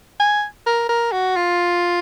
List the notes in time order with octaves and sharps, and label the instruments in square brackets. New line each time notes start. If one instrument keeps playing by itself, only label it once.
[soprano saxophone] G#5
A#4
A#4
F#4
F4